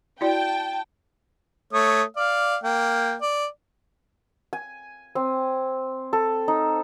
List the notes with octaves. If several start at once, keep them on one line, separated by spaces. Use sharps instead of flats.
E4 F#4 D5 G5 A5
A3 C#5 D#6
D5 F5
A#3 G5
D5
G#5
C4
A4
D#4